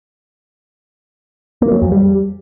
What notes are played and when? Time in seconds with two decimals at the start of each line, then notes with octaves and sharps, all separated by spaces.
1.62 A#3
1.72 F#3
1.82 F2
1.92 G3